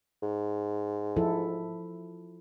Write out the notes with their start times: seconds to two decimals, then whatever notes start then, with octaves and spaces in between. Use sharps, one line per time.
0.23 G#2
1.16 F3 E4 A4